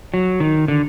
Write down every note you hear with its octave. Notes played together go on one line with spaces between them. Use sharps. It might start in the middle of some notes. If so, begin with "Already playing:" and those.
F#3
D#3
D3